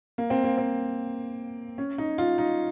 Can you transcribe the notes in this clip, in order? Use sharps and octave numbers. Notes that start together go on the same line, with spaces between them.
A#3
C4
A#3
C4
C#4
D#4
F4
D#4